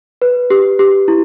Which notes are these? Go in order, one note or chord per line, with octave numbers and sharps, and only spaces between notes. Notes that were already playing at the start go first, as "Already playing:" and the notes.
B4
G4
G4
E4